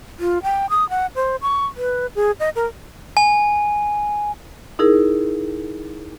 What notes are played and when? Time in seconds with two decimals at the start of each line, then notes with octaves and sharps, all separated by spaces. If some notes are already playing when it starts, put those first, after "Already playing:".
0.20 F4
0.43 G5
0.70 D#6
0.90 F#5
1.16 C5
1.42 C#6
1.77 B4
2.15 G#4
2.40 D#5
2.56 A#4
3.17 G#5
4.79 D#4 E4 G#4 A#4